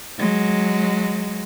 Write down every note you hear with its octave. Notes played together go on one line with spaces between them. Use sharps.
F#3 G#3